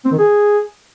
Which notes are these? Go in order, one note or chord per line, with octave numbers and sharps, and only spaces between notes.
C4
D#3
G#4